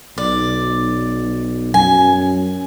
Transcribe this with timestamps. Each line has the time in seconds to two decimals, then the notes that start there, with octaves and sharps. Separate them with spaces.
0.18 B1 D5
1.74 F#2 G#5